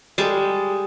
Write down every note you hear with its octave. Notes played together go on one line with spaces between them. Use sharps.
G3 G#3 A4 A5